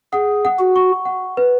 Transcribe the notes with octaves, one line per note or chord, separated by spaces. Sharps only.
G#4 F#5
F#5
F#4
C#6
F#5
B4